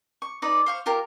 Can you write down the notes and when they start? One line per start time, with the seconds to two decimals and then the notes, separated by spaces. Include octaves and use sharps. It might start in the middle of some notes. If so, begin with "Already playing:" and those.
0.22 C#6
0.42 D#4 B4 D5
0.66 C5 F5 C#6
0.86 F4 G4 A#4